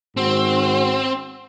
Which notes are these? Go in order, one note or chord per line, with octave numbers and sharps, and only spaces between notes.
G#2 D#3 C4 F#4